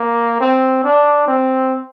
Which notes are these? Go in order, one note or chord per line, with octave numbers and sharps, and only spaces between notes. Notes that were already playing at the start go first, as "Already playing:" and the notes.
Already playing: A#3
C4
D4
C4